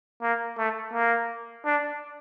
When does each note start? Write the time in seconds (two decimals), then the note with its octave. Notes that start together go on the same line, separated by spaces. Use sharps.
0.22 A#3
0.58 A3
0.93 A#3
1.65 D4